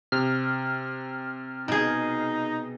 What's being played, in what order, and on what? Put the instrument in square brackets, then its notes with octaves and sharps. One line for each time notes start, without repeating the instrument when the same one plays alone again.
[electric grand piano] C3 [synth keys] F6
[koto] B2 G#4 [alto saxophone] D#4